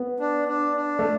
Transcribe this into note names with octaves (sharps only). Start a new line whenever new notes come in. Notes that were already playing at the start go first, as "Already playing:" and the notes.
Already playing: B3
D4
D4
D4
A3